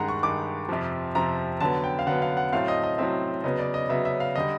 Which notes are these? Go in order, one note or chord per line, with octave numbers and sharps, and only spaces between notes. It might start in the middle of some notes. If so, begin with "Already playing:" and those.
Already playing: G2 D#3 G#3 F#5 A#5
C#6
G2 D#3 G#3 D6
F2 C3 F3
F2 C3 F3 A#5
D3 F#3 B3 A5
G5
F5
D3 F#3 B3 F#5
F5
F#5
A2 F#3 A3 C4 F5
D#5
D#5
A2 F#3 A3 C4 E5
C#3 F#3 B3 D#5
D5
D#5
C#3 F#3 B3 E5
E5
F5
D3 G3 D#5